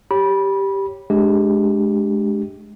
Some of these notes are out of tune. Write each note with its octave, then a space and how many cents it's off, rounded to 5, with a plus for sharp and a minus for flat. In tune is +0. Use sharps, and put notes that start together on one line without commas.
G4 +0 C#5 +0 B5 -20
G#3 +25 D4 +0 G4 +0